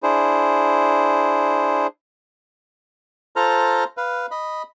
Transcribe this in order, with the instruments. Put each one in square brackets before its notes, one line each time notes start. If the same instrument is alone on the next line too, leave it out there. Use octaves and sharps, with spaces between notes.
[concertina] D4 E4 G#4 C5
F4 A4 C5 A#5 F6
B4 F5
D#5 B5